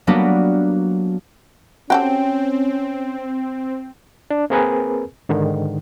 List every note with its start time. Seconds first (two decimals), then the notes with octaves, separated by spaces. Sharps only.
0.07 F#3 G3 A#3 B3 D4 F#4
1.90 C4 C#4 F#4 G4 A4 G5
4.31 D4
4.50 A#3 C4 G#4 A#4 B4 G#5
5.29 G#2 D3 D#3